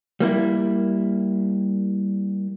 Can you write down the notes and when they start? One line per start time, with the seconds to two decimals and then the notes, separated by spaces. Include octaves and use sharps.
0.20 G3 A#3 E4